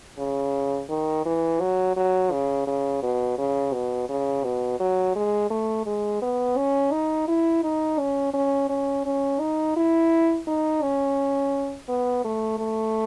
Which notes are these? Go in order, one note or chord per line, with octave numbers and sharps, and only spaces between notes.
C#3
D#3
E3
F#3
F#3
C#3
C#3
B2
C#3
B2
C#3
B2
F#3
G#3
A3
G#3
B3
C#4
D#4
E4
D#4
C#4
C#4
C#4
C#4
D#4
E4
D#4
C#4
B3
A3
A3